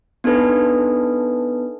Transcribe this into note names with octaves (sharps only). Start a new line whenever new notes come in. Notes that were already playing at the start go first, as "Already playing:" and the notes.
B3 D4 D#4 A4 B4